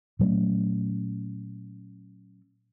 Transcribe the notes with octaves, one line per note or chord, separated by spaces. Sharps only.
A#2 F#3 A3 C#4